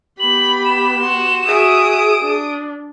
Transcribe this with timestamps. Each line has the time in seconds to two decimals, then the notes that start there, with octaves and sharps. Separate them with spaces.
0.20 B3 G4 B5 F#7
0.65 E7
1.01 F#4 C6
1.47 F#4 G#4 E5 D#6 D7
2.21 D4